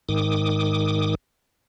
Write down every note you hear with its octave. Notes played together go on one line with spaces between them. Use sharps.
G#2 D#3 D6 D#6